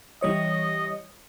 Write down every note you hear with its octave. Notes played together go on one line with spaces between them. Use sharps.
E3 G3 C#5 D#5